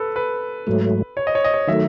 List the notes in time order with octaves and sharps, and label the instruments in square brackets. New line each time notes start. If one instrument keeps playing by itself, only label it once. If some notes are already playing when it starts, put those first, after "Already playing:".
Already playing: [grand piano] A4 B4
B4
[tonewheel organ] G#2 F#3 A3
[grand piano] C#5
D#5
C#5
D#5
C#5
[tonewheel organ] D#3 F#3 A3 [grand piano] E5